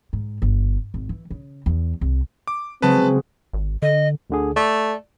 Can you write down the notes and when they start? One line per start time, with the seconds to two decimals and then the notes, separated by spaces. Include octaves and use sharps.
0.13 G#2
0.42 G1
0.94 G#1
1.09 E3
1.31 C#3
1.66 E2
2.01 C2
2.47 D6
2.82 C#3 F#3 G#3 C4 B4 A5
3.53 G#1
3.82 D3 D#5
4.30 D2 D3 G#4
4.56 A3 D5